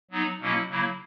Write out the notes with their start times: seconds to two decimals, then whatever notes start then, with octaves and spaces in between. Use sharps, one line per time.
0.11 F#3 B3 D#4
0.41 B2 F#3 A#3 C#4 E4
0.69 C#3 F#3 A#3 E4